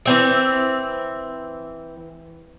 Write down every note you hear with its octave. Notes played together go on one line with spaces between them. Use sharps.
E3 C4 E5